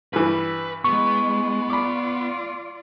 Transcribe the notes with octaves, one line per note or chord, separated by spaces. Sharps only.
G2 E3 B4
G#3 B3 C#6
F4 D5 B5 D6